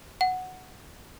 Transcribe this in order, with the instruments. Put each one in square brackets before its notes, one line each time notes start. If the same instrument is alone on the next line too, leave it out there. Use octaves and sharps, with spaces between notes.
[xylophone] F#5